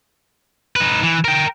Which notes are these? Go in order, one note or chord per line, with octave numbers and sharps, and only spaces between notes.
D#4 B4
E3
A#4 G5